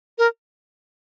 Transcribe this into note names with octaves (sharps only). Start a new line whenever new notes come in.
A#4